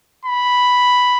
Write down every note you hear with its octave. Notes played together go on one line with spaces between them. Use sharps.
B5